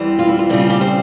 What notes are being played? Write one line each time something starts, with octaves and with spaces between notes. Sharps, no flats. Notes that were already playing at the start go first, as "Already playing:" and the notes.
Already playing: E2 E3 G3 C4
F4
E4
F4
C#3 G3 C4 E4
F4
G4
C5